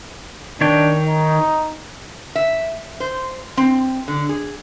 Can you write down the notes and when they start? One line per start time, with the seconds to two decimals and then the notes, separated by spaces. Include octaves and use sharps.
0.61 D#3 D4 C#5 G5
1.06 D#4
2.35 E5
3.00 C5
3.57 C4
4.08 D3
4.29 G#4